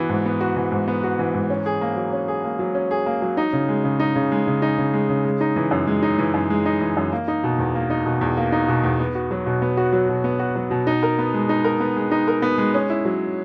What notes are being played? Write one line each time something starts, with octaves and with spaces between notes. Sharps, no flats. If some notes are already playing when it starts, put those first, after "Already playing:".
Already playing: E3 B3 F#4
G#2
B3
F#4
E3
G#2
B3
F#4
E3
G#2
C#4
G#4
A#3
F#3
C#4
G#4
A#3
F#3
C#4
G#4
A#3
F#3
D#4
C#3
G#3
C#3
D#4
C#3
G#3
C#3
D#4
C#3
G#3
C#3
G#3
D#4
E3
F#2
G#3
D#4
E3
F#2
G#3
D#4
E3
F#2
A#3
D#4
B2
E2
A#3
D#4
B2
E2
A#3
D#4
B2
E2
B3
F#4
F#3
B2
B3
F#4
F#3
B2
B3
F#4
F#3
B2
D#4
A#4
B3
G#3
D#4
A#4
B3
G#3
D#4
A#4
B3
G#3
C#4
E4
F#3